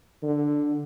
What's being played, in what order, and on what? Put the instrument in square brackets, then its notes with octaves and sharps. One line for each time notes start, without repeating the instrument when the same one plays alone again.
[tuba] D3